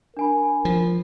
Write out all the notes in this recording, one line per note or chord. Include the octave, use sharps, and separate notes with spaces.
D4 A#4 G#5 B5
F3